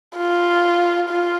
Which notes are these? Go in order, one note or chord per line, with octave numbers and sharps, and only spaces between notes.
F4
F4